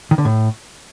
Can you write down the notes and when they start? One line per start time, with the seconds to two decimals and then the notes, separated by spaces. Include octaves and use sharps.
0.11 D#3
0.18 D3
0.25 A2